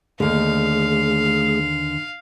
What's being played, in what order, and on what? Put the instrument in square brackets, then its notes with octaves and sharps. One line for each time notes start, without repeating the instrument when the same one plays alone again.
[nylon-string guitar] D#2 D3 [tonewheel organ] A3 G#4 [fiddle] F5